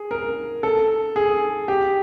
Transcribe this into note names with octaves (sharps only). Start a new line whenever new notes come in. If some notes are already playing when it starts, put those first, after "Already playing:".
Already playing: G#4
A#4
A4
G#4
G4